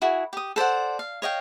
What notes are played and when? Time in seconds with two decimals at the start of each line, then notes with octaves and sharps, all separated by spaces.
0.02 E4 F#4 G#4
0.33 G4 D#6
0.56 A4 C5 D5 F#5
0.99 F5
1.22 C#5 D#5 F5 G5